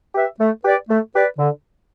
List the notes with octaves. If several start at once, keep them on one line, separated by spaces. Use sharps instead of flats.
G4 B4 E5
A3
G4 B4 D5
A3
G4 B4 D5
D3